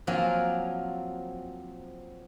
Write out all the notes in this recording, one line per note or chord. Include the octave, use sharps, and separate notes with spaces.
F3 F#3 A#3 C4 A#4 G#5